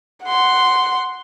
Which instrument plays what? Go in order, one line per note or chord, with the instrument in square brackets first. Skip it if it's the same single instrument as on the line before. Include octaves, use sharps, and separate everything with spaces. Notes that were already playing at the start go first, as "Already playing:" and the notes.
[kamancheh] F#5 C6